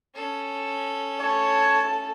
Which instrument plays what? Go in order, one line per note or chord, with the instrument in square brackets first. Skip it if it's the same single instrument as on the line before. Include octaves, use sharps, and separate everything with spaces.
[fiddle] C#4 A4
[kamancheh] A3 A5 [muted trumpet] C#5